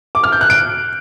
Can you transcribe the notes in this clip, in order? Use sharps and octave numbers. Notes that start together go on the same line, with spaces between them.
D6
F6
G6
F#6
D7